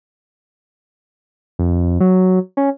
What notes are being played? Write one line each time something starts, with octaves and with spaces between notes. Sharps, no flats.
F2
F#3
C#4